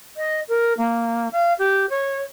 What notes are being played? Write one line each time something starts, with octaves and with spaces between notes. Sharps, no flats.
D#5
A#4
A#3
F5
G4
C#5